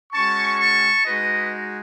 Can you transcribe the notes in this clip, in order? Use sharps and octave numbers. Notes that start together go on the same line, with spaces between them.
G#3 C#4 F#4 A5 C#6
A5 C#6
G#3 D#4 F#4 B4 D#5